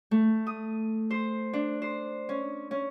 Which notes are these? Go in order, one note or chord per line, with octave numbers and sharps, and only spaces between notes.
A3
D#6
C5
D4
C5
C#4
C#4